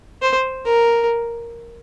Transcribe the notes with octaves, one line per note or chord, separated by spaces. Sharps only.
C5
A#4